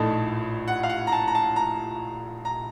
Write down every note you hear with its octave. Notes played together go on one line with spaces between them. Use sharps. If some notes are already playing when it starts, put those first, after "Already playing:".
Already playing: A#1 A2 A3 D#4 A5
F#5
F5
F#5
A#5
A5
A#5
A5
A#5
A#5